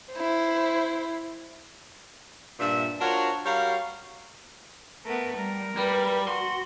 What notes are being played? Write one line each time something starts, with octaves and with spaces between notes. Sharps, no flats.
E4 C5
G2 A#2 E5
D4 F4 F#4 A#4 C5 C#5
G3 F#4 A#4 C#5 F5
A3 B3 A#4
G3 A#4
G3 B4
F#4 C6